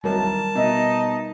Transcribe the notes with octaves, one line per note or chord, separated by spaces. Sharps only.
C2 D#3 F#3 G3 A#4 A5
A#5
B2 D#4 E5